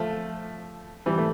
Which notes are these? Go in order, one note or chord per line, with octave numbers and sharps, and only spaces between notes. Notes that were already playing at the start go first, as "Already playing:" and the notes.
Already playing: F3 A3
E3 G3
A3